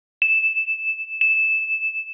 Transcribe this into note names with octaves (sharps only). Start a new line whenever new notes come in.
E7
E7